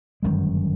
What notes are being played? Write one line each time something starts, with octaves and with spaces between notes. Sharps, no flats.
G1 F#2 D#3 G#3